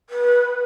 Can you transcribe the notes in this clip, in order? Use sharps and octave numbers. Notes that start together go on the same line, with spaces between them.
B4